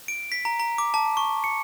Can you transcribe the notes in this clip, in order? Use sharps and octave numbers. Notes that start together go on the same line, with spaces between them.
D7
B6
A#5
A#5
D6
A5
C#6
C#7